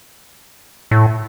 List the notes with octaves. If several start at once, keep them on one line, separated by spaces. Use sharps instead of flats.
A2